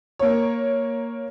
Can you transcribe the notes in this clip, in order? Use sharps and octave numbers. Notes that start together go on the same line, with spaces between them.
A#3 C#5